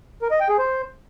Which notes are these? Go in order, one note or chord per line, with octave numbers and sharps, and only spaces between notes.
A#4
D#5
G5
G#4
C5